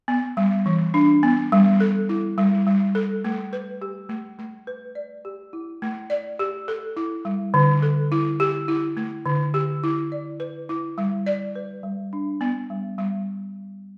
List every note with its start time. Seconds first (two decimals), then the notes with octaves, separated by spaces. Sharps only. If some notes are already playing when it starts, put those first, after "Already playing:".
0.08 B3
0.37 G3
0.66 E3
0.94 D4
1.23 B3
1.52 G3
1.80 A4
2.09 E4
2.38 G3
2.67 G3
2.95 A4
3.24 A3
3.53 B4
3.82 G4
4.09 A3
4.39 A3
4.67 B4
4.95 D5
5.25 G4
5.53 E4
5.82 A3
6.10 D5
6.39 G4
6.68 A4
6.97 E4
7.25 G3
7.54 D3
7.82 A4
8.12 E4
8.40 G4
8.68 E4
8.97 A3
9.26 D3
9.54 G4
9.84 E4
10.12 D5
10.40 B4
10.69 E4
10.98 G3
11.26 D5
11.56 B4
11.83 G3
12.13 D4
12.41 B3
12.70 G3
12.98 G3